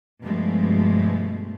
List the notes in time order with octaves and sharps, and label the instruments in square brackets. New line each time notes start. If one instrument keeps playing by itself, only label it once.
[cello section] G2 B2 F3 G#3 A3